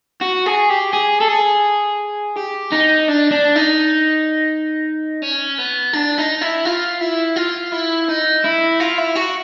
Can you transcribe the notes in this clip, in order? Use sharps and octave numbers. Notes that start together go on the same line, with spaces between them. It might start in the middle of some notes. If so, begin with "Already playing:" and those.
F#4
G#4
G4
G#4
A4
G#4
G4
D#4
D4
D4
D#4
C#4
B3
D4
D#4
E4
F4
E4
F4
E4
D#4
E4
F4
E4
F#4